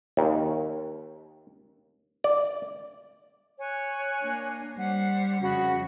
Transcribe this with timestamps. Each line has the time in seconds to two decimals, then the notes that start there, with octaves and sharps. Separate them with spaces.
0.17 D#2
2.24 D5
3.59 C#5 G#5 F#6
4.21 A#3 D4
4.77 G3 C5 F#5
5.42 F2 C#3 F#4 B5